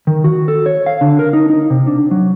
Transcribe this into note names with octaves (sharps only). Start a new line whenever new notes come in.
D#3
F#4
A4
C#5
F5
D3
A#4
D#4
D#4
C3
D4
F#3